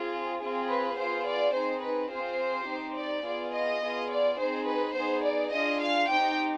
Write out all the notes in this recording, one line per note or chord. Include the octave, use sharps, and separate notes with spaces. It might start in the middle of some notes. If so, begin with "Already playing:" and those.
Already playing: C4 F4 G#4
C4 F4 G#4
B4
B3 F4 G#4 C5
D5
C4 D#4 G#4 C5
B4
C4 F4 G#4 C5
C4 D#4 G4
D5
B3 F4 G#4 D5
D#5
B3 F4 G#4
D5
C4 D#4 G#4 C5
B4
B3 D#4 G#4 C5
D5
D4 F4 G#4 D#5
F5
C4 D#4 G4 G5